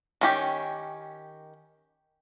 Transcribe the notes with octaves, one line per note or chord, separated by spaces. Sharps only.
D#3 C#4 G4